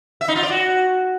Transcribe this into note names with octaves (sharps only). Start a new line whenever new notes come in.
E5
D#4
F4
D5
F#4